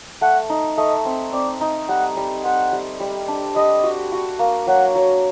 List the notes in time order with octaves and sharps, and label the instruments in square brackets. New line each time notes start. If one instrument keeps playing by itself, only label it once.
[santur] A3 [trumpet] F#5
[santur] D#4
[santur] A3 [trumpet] D#5
[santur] C4
[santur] C4 [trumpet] D5
[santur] D#4
[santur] G3 [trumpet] F#5
[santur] G3
[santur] C5 [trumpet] F#5
[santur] G3
G3
D4
[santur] G3 [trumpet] D#5
[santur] F#4
F#4
A#3
[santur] F#3 [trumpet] F#5
[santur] F#3